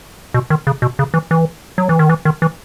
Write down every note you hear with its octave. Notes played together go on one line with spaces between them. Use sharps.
B2
D#3
C#3
B2
C#3
E3
E3
F#3
E3
D#3
E3
D#3
E3